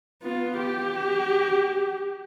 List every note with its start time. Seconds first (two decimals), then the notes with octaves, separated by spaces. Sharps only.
0.22 B3 F4
0.57 G4